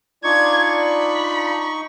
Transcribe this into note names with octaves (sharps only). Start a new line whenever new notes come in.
D4 D#4 F4 D5 C#6 G#6
B5